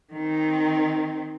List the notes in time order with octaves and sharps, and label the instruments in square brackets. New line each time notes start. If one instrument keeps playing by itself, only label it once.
[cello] D#3 C4